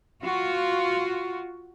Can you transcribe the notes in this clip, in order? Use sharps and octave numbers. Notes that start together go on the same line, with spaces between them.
F4 F#4